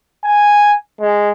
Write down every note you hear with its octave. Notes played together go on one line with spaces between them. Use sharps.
G#5
G#3